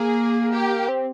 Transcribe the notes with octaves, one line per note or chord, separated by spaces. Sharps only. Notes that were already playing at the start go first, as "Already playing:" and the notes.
Already playing: A#3 G#4
G4
C4